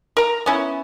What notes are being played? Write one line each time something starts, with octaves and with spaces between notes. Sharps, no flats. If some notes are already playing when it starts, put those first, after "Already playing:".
A#4 A#5
B3 C#4 E4